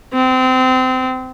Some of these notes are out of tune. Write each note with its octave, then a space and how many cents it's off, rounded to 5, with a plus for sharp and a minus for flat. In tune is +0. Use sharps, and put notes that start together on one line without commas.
C4 -25